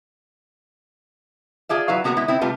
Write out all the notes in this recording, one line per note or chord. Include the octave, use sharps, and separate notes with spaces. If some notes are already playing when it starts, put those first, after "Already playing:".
F4 G#4 D5 E5
F#3 E4 B4 F5
A#3 B3 F#4 G#4 A#4 B4
G#3 B3 E4
C4 E4
C3 G3 A3 F4 B4